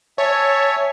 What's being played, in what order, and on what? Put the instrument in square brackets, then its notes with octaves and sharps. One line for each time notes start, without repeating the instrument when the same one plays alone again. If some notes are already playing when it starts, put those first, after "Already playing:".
[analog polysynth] C#5 [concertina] E5 G#5 A5